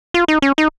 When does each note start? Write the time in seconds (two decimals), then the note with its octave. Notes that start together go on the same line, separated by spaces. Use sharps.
0.14 F4
0.28 D#4
0.42 C#4
0.58 D#4